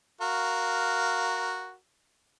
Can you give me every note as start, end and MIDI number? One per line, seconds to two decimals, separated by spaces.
0.21 1.74 66
0.21 1.74 70
0.21 1.74 77